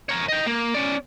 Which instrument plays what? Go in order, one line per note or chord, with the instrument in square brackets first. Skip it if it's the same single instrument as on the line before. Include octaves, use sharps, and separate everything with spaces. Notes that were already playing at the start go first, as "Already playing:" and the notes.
[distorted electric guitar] A#4 C#5
D#5 G5
A#3
C#4 D5